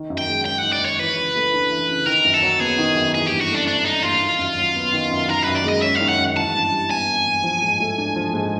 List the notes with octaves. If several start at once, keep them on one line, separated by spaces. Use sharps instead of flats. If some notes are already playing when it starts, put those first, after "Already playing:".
Already playing: D#3
F#2
G5
G#3
C#4 G5
F#5
D#3
D5
F#2 C#5
E3 B4
C#3
A3
D4
E3
C#3
D#3 A#4
F#2
A4
F#3
B3 G#4
D#3
F#2
E3 G#4
G2 G4
F#4
A3 D4
C4 D4
E3 D#4
G2 F4
D#3
F#2
F#3
B3
D#3
F#2
D#3 A#4
F#2 B4
D5
G#3 D#5
C#4 E5
D#3 F5
F#5
F#2
E3 A5
G2
G3
B3 G#5
E3
G2
F3
G#2
A3
D4
F3
G#2